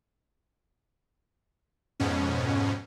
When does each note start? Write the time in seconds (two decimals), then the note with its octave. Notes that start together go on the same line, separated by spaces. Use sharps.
2.00 F2 G#2 B2 C#4